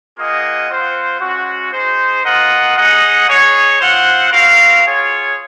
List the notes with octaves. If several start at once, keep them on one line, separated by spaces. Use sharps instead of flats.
A#3 F4 G#4 D#5 F#5
C4 F4 C5 F#5
G#3 C#4 F#4
D#4 G#4 C5
F4 A#4 D#5 F#5
D#4 G#4 D#5 F#5
D#4 G#4 C#5
C4 F4 C5 F#5
C4 F#4 A#4 F5
F4 G#4 C#5